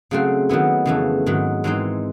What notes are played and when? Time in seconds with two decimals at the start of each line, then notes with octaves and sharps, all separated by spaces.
0.11 C#3 F#3 A3 C4
0.49 D#3 F#3 B3 E4
0.85 F2 C#3 E3 A3
1.26 G#2 D#3 F#3
1.64 G#2 E3 G#3 C4 D#4